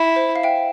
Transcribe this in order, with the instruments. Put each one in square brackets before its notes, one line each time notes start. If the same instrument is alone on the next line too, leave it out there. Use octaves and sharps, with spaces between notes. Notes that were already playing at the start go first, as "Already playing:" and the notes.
Already playing: [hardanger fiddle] E4
[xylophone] C5
F5
E5 G5